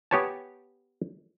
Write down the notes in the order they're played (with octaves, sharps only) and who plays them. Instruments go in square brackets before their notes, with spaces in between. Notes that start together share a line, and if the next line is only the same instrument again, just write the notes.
[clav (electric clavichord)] B3 G4 B4 C#5 G#5 A5